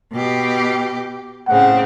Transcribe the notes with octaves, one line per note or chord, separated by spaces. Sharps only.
B2 G4
A2 C#3 C4 F#5